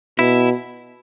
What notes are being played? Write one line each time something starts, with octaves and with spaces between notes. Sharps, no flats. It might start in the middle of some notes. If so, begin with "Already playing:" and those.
B2 E4